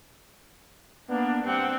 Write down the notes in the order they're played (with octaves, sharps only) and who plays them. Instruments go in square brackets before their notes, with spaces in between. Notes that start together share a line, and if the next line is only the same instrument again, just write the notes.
[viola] A#3 [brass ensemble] B3 D4
[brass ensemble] G2 G4 F#5 [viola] C4